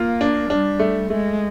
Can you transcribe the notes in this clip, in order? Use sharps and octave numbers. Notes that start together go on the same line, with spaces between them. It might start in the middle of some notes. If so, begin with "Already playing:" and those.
Already playing: A#3 F4
D4
G3 D4
A3
G#3 A3